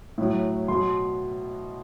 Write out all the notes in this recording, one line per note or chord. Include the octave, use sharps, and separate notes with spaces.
A2 F#3
B2 F#3 C6